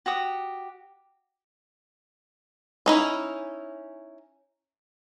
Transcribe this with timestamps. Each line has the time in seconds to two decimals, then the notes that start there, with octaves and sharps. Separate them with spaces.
0.06 F#4 G4 D#6
2.86 C#4 D#4 E4